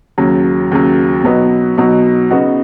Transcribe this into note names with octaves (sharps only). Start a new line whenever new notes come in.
D#2 C#3 F#3
D#2 C#3 F#3
B2 F#3 B3 D#4 F#4
B2 F#3 B3 D#4 F#4
C#3 B3 D#4 F#4